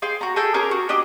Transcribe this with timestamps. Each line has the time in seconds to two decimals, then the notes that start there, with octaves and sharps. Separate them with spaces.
0.02 G#4 F5 G5 C6
0.21 F#4 A#5
0.36 G#4 A4 G5
0.54 C#4 G4 G#4 A#4
0.71 F#4
0.89 D4 G4 D#5 D#6